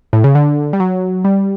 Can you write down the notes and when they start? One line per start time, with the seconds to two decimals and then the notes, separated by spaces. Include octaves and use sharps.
0.13 A2
0.24 C#3
0.35 D3
0.73 G3
0.80 F#3
1.25 G3